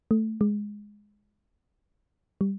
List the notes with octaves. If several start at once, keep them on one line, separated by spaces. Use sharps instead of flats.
A3
G#3
G3